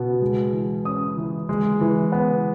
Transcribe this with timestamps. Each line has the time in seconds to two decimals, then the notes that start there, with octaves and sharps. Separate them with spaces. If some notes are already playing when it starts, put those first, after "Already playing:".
Already playing: B2 B3
0.22 G#3
0.53 E3
0.85 C#4 D#6
1.17 E3
1.49 G#3
1.81 E3
2.12 B3